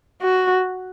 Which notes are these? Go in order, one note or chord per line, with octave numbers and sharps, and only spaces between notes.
F#4